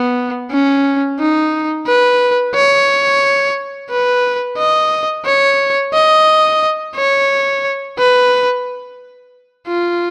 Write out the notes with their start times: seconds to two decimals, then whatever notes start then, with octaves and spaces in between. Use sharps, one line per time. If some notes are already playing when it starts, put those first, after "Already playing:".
Already playing: B3
0.51 C#4
1.19 D#4
1.86 B4
2.55 C#5
3.90 B4
4.58 D#5
5.26 C#5
5.94 D#5
6.96 C#5
7.98 B4
9.67 F4